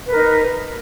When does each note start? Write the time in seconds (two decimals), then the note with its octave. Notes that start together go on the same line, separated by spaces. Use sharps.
0.05 B4
0.10 A#4
0.15 D#4